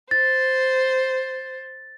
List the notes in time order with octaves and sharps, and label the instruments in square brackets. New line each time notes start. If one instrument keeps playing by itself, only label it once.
[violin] C5 [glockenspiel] A6